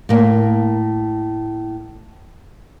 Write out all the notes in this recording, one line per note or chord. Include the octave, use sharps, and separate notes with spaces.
A2 A#3